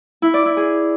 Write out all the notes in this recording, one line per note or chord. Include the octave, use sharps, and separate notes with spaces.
E4
D5
E4
G#4